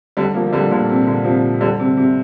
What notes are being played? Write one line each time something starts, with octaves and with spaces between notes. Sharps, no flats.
D3 G3
F3 A#3
F3
D3 G3
A#2 D3
C3
A#2 D3
C3 F3
D3 G3
C3
C3